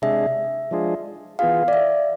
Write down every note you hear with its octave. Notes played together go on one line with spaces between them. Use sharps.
C3 G#3 D4 G#4 E5
F3 G#3 D4 F4 G#4
E3 B3 F4 G#4 F5
D5
E5